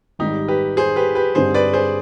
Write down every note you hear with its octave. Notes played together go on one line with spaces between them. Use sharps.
G#1 G#2 G3 D#4 G4
G4 B4
G#4 C5
G4 B4
G4 B4
G2 D3 G3 C4 D#4 G#4 C5
B4 D5
G#4 C5